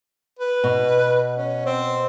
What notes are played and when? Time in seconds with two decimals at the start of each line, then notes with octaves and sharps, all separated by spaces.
0.39 B4
0.64 B2
1.38 C#4
1.66 C4